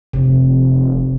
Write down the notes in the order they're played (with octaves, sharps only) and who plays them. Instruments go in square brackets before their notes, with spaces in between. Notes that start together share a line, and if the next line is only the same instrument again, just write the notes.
[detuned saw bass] F1 [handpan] C3